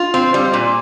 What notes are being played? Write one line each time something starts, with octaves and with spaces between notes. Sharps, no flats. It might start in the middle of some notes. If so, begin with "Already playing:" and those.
Already playing: F4
C4
G3
A#2